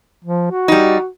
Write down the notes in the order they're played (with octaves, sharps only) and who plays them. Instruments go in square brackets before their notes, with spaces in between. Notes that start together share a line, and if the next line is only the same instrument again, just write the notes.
[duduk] F3
F#4
[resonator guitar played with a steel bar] G3 D#4